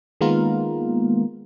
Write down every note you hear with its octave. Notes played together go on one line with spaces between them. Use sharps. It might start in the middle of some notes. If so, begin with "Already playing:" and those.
D#3 G#3 A#3 B3 F4 A#4